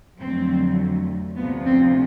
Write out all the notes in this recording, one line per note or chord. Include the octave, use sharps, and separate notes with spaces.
F2 D3 F#3 A3 C4
D2 C3 F3 B3
C4